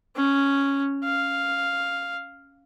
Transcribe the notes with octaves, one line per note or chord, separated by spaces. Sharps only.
C#4
F5